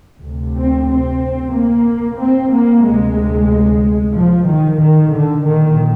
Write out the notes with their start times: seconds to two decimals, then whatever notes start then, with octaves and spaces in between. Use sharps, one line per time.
0.22 D2 C3
0.56 C4
0.88 C4
1.53 A#3
2.19 C4
2.51 A#3
2.84 D2 C3 G#3
4.14 F3
4.47 D#3
4.80 D#3
5.13 D3
5.45 A#1 A#2 D#3